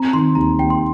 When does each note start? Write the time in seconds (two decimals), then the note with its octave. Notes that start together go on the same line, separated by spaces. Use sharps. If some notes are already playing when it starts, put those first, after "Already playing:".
Already playing: C4 A#5
0.13 D#3 C6
0.35 D#2 A#5
0.58 D#2 G5
0.70 C6